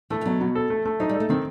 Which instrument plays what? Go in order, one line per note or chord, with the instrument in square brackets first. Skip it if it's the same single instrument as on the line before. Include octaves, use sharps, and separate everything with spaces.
[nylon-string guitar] E3 [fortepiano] A3
[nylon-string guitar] E3
[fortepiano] B2 [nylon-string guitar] F#3
[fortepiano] B2
A4
A3
A3
[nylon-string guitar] F#3 [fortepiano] D#4
[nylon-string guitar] G3
[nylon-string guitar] A3 [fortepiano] A4
[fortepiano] D#3 [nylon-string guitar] C4